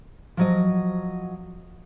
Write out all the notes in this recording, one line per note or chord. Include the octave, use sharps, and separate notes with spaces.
F3 F#3 D#5